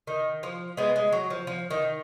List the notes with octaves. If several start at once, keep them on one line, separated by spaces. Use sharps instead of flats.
D#3
F3
G#3 B3
G#3
F#3
F3
F3
D#3